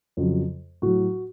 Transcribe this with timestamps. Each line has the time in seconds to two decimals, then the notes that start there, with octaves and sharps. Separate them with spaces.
0.17 F2 C#3 F#3
0.82 A2 F#3 F#4